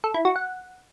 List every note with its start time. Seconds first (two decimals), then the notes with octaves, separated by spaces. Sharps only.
0.04 A4
0.14 E4
0.25 F#4
0.36 F#5